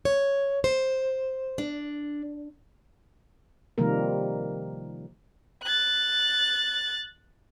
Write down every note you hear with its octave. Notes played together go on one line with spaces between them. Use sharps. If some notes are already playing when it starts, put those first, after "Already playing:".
C#5
C5
D4
C3 D#3 F3 G3 A#3 A#4
F#6 A6